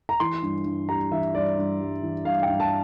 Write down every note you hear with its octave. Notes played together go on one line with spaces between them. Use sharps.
A#5
E3 C6
G2
G2
G3 A#5
E3 E5
G2 D5
G2
G3
E3
G2 F5
G5
G2
A5